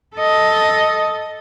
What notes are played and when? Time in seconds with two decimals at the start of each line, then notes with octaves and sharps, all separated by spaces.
0.17 A4 D#5